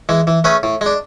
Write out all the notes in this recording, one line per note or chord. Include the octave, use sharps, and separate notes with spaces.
E3 G#3
E3
A3 C#4 G#4 B4
A2
G#3 D4